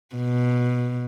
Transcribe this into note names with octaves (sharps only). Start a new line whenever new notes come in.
B2